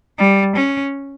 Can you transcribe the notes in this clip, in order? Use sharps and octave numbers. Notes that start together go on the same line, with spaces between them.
G3
C#4